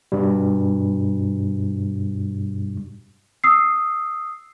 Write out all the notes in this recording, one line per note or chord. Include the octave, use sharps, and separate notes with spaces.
G2 B2 G3
D#6 E6 C7